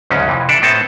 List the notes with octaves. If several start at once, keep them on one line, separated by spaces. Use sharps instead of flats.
D2 G#2 C#3 F#3 C#4
F2 C3 E3
D4 A4 D5 E5
A2 B3 C4 A4 G#5 A5